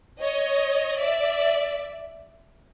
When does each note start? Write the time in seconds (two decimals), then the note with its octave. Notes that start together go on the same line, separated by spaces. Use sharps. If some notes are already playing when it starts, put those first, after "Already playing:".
0.20 C#5 D#5
0.97 D5 E5